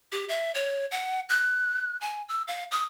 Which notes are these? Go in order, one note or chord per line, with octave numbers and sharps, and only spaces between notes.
G4
E5
C#5
F#5
F#6
G#5
E6
F5
D#6